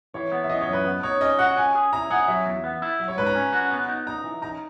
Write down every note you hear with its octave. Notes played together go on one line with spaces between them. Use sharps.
E3 C#5
B3
E5
E3 D#5
C#5
F#2
B4
B3
D#4 C#5
C#4 D#5
F#4 F#5
C#4 G#5
G#4
E4 A#5
G#4 F#5
F#3 E5
E2
B3
E4
F#3
C#5
G#2 B4
A#5
C#4
F#4
B3
D#4
D#4 A#5
E3
D#4 A#5